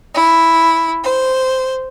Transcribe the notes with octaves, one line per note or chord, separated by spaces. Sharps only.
E4
C5